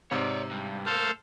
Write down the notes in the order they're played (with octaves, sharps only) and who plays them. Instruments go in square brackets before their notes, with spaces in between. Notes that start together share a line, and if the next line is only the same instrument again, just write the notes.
[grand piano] G#2 C3 [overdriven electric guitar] C#5 D5
[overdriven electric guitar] G2
[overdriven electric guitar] A3 A#3 [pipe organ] A4 C5 F5